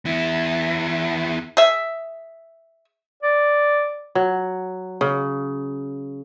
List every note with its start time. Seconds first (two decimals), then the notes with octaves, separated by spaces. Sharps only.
0.05 E2 E4
1.57 G#4 E5
3.23 D5
4.15 F#3
5.01 C#3